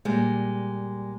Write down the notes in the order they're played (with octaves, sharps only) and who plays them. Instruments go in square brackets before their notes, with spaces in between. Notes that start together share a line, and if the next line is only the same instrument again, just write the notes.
[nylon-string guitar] A#2 G3 G#3